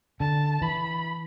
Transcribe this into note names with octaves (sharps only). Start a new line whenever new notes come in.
D3 A5
E3 B5